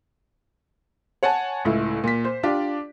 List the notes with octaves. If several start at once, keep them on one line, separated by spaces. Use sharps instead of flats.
C#5 F#5 G#5 A5
C#2 A2 E4
A#2 B6
C5
D4 F4 G4 D5